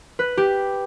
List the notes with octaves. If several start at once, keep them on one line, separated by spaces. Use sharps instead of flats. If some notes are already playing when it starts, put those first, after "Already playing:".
B4
G4